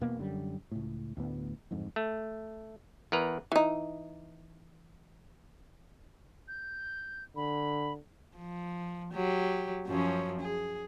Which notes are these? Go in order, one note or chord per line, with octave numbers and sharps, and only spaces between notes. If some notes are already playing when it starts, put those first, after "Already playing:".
E1 B2 A#3 B3
F#2 D3 G3
C#2 A2
D2 A2 B3
D1 F2 G#2
A3
E2 A#4 B4 A#5
E3 D#4
G6
D3 B5
F3
F#3 G4
F#2 F3 C#4
G#4